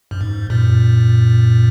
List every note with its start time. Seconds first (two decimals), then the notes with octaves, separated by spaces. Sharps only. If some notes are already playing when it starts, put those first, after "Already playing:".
0.11 F#2
0.21 G#2
0.50 F#2 A#2